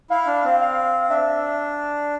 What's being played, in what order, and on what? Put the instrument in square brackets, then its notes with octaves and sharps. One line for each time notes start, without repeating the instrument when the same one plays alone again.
[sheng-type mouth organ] E4 [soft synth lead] F5
[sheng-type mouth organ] D4
C4
[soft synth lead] F5
[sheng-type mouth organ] D4 [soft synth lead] E5